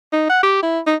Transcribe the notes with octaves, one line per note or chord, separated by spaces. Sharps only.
D#4
F#5
G4
E4
D#4